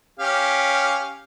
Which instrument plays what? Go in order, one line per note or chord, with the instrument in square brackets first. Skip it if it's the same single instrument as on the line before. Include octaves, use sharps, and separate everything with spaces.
[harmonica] C#4 G4 F5